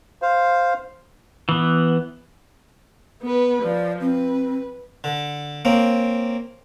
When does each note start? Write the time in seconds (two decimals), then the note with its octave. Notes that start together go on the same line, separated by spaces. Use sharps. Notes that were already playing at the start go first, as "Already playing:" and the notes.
0.22 C5 F5
1.49 E3 B3
3.22 B3 B4
3.63 F3 D5
4.01 C4 B4
5.04 D3
5.65 A#3 C4 C#4